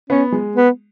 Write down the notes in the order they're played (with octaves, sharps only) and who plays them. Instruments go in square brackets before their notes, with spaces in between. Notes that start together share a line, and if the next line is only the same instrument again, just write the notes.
[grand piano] B3 [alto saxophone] C#4
[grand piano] G#3
[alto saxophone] B3